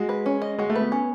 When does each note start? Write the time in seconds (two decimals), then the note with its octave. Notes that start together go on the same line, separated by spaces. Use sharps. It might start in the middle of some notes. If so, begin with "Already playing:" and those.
Already playing: G#3 F#4
0.09 B4
0.26 C#4
0.42 D#5
0.58 G#3 F#4
0.70 A3
0.75 B4
0.81 B3
0.92 C#4